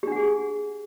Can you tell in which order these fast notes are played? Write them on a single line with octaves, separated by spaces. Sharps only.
G4 D4 F#5 G#4